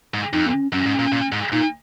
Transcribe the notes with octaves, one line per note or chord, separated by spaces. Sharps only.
G#2
F2 D#4
B3
C#4
F#2 C#4
G#2
A#2
A#2
G#2
A#2 D#4